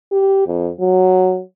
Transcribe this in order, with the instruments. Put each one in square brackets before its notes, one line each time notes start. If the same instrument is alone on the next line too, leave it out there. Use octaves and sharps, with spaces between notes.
[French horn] G4
F2
F#3